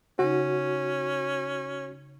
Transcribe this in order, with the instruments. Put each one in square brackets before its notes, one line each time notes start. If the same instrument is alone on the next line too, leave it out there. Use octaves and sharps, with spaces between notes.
[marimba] C#3 D#4 [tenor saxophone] C#4 [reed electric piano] F#4